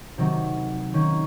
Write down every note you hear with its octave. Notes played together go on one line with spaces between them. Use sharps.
C3 D#3 F#3
D#3 A#3 C#4